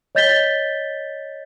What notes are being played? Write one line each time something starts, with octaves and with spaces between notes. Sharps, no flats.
C#5 D#5 G6 A6 B6 G7